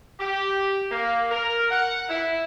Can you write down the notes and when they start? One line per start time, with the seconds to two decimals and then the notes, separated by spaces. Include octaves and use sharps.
0.20 G4
0.91 A#3
1.30 A#4
1.71 F#5
2.09 E4